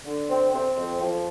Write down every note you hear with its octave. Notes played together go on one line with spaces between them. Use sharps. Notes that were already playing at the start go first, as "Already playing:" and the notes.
D3
C4
C4
F2
F3